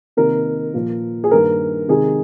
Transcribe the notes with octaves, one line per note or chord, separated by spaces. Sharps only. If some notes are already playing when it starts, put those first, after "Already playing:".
C3 D#3 A#3 A#4
A#2 F3 A#3
G#4
G2 D#3 A#3 A#4
C3 D#3 G#3 G#4